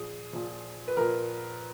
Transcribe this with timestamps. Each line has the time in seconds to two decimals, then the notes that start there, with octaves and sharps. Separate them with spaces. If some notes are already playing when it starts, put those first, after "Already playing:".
Already playing: A#2 F3 G#4
0.33 A#2 F3
0.88 B4
0.97 A#2 F3 A#4